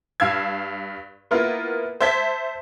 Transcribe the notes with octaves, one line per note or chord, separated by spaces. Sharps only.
G2 F5 E6 G#6
A#3 B3 E4 F4 A#4
C5 E5 A5 G#6 B6